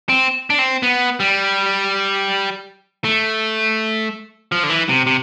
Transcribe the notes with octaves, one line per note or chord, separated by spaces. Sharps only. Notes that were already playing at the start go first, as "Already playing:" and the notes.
C4
D4
C4
B3
G3
A3
F3
D3
E3
C3
C3